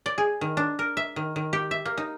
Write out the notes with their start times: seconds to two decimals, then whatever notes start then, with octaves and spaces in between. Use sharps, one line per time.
0.06 D5
0.18 G#4
0.41 D#3
0.57 D4
0.79 A#4
0.97 E5
1.16 D#3
1.36 D#3
1.53 G4
1.71 E5
1.85 A#3
1.97 D#4